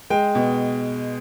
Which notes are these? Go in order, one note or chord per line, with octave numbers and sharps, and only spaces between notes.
G#3 G5
B2